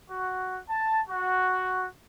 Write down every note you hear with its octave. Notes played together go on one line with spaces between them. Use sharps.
F#4
A5
F#4